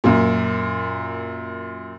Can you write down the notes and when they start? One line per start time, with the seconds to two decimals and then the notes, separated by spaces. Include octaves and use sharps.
0.04 F#2 A#2